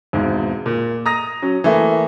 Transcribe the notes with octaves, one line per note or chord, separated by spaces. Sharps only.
G#1 E2 G#2 B2
A#2
A#5 D#6 A#6
F#3 C#4
E3 A3 A#3